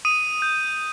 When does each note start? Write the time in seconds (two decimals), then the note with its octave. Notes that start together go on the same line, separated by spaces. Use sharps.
0.05 D#6 D#7
0.42 G6